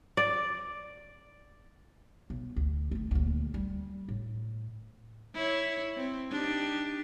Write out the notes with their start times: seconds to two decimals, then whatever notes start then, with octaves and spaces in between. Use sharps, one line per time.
0.17 D5
2.30 B1
2.56 D2
2.91 D#3 A3
3.11 D#1 D2
3.54 G3
4.08 A2
5.34 E4 C#5
5.97 C4
6.31 D4 D#4 G4